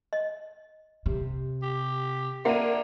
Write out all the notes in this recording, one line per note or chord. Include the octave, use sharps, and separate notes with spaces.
D#5
C3
G4
D3 A#3 E5 F#5 D#7